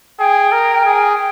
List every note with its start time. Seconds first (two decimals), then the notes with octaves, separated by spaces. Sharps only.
0.19 G#4 G5
0.52 A#4
0.85 G#4
1.17 G5